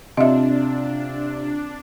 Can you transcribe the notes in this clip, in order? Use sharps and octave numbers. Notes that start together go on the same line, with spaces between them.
C3 C4 D4 F4 D#5 E5